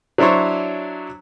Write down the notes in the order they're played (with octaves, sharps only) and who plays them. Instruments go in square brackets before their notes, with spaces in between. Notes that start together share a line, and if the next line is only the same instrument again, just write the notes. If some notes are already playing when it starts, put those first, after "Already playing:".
[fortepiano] F#3 D4 E4 C5 C#5